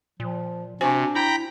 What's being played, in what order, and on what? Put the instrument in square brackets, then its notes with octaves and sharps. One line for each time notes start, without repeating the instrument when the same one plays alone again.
[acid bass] A#2 [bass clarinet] F3
[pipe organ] C3 [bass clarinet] D4 [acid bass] F#4 [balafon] C5 G#5
[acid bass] E4 [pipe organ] G5 A#5 B5